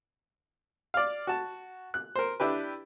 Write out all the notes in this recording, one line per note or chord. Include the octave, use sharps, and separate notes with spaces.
D5 F5
F#4 A5
F#6
A#4 C5
D4 E4 G4 B4